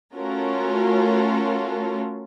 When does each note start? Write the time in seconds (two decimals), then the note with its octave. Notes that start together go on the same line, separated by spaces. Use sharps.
0.16 A3 C#4 F4 F#4 A4 A#4